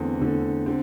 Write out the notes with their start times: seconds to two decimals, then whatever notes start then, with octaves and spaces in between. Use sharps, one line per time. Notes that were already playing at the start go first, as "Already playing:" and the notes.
Already playing: E2 D3 A3 C4
0.21 E2 D3 A3
0.66 D3 C4